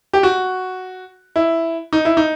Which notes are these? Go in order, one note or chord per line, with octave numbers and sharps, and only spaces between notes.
G4
F#4
E4
D#4
E4
D#4